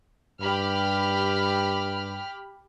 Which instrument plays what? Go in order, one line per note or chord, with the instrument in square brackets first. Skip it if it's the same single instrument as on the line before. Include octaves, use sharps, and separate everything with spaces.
[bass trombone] G2 [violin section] G4 B5 F6